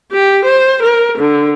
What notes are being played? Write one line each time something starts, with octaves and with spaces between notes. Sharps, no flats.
G4
C5
A#4
D3